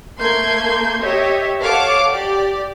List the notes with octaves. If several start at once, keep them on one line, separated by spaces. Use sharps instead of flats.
A3 A#3 C6 G6 G#6
G4 C#5 D#5 E5
A4 C#5 F5 F#5 A5 D6
G4 D5